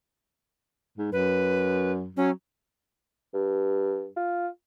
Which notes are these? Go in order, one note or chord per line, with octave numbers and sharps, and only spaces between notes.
G#2
F#2 B4
F#3 C#4
G2
F4